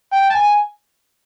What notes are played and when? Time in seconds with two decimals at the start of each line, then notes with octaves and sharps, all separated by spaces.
0.12 G5
0.30 A5
0.35 G#5